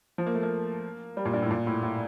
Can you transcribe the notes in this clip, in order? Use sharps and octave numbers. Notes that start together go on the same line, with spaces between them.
F3
A#3
A3
A#3
G3
A#2
G2
A2
A#2
A2
A2